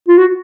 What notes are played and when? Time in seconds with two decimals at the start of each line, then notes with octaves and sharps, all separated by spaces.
0.08 F4
0.18 F#4